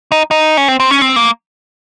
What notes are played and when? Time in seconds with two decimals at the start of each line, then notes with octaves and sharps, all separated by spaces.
0.12 D#4
0.31 D#4
0.57 C#4
0.68 C4
0.80 C4
0.91 C#4
1.01 C4
1.16 A#3